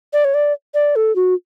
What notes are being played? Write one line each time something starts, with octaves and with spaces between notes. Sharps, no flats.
D5
C#5
D5
D5
A4
F#4